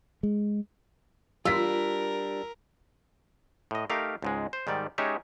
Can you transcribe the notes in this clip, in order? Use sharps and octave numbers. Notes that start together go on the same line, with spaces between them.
G#3
G3 D4 F4 A#4 E6 B6
A2 D#5
A3 D#4 G4 A#4 F5
C#2 G#2 G#3
C5
G#2 D#3 G3 D5
G#3 C#4 D#4 G4 C#5 E5